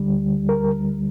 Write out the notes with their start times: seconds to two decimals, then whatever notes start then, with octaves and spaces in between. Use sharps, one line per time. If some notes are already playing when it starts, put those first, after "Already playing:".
Already playing: D2 D3 G3
0.49 A#4